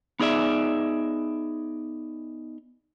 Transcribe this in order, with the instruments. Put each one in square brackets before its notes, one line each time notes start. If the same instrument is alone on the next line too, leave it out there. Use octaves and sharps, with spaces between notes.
[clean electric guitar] B3 D#4 G#4 D5 E5